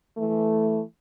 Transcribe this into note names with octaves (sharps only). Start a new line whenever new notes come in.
E3 A3